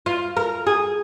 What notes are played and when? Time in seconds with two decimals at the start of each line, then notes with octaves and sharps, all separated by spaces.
0.06 F4
0.37 A#4
0.67 G#4